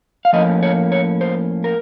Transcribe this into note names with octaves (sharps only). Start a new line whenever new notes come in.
F5
A2 F3 A#3 C#4 D#5
C#5
C#5
C5
A#4